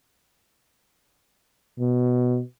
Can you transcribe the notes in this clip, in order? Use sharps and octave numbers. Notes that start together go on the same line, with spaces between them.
B2